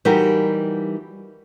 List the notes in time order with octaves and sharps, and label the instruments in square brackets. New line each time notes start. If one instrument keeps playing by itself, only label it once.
[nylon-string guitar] E3 G3 D#4 F#4 G4 A#4